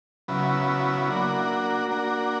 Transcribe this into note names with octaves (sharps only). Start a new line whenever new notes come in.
C#3 F#3 B3 E4
A#3 D4 F#4 A#4
A#3 D4 F#4 A#4